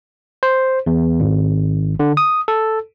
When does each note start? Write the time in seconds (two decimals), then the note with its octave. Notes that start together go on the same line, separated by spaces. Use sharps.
0.43 C5
0.86 E2
1.20 G#1
2.00 D3
2.17 D#6
2.48 A4